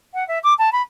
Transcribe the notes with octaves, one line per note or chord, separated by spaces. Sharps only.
F#5
E5
D6
A5
B5